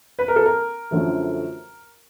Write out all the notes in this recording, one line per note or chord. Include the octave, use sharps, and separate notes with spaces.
B4
A#4
A4
A#4
F#2 D3 F3 A3